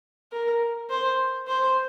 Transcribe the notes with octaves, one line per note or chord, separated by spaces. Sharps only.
A#4
C5
C5